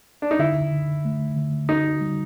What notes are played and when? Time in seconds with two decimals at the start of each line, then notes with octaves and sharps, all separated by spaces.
0.22 D4
0.31 D#4
0.39 D3 E4
0.72 D3
1.05 A3
1.37 D3
1.69 D#4 F#4
2.01 G3